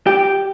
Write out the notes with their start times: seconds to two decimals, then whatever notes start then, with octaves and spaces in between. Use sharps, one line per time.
0.07 G4